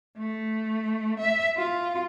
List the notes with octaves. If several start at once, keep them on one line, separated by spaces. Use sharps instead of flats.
A3
E5
F4